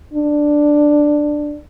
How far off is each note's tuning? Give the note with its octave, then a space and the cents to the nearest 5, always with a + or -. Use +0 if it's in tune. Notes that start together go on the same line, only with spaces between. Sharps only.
D4 +5